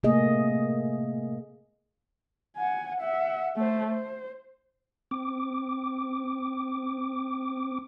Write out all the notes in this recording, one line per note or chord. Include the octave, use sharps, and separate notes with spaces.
C3 A3 A#3 G#4 D#5
F#5 G#5
E5 F#5
A3 C5
C5
C4 D6